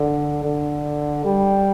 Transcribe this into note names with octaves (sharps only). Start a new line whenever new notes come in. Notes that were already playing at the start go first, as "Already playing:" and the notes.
Already playing: D3
D3
G3